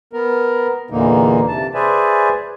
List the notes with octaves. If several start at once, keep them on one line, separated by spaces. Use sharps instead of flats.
B3 A#4
E2 A#2 D3 E3 A#3 D#4
C3 A5
G#4 B4 C5 D5 E5 G#5